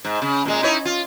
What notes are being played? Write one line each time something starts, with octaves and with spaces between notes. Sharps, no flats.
G#2
C#3
A#2 G#3
D#4 E4 C#5
F4